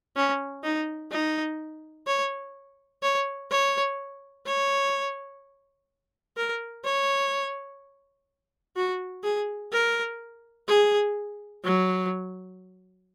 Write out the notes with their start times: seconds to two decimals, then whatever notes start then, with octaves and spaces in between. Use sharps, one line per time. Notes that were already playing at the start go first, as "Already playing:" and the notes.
0.16 C#4
0.63 D#4
1.11 D#4
2.07 C#5
3.02 C#5
3.51 C#5
4.46 C#5
6.37 A#4
6.85 C#5
8.76 F#4
9.24 G#4
9.72 A#4
10.68 G#4
11.64 F#3